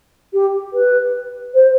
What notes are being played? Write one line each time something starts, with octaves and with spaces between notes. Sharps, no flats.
G4
B4
C5